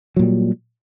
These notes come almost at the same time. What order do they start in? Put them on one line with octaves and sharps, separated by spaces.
F#3 A#2 G3